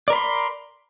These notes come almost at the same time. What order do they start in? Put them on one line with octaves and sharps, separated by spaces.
D5 A#4 B5 C6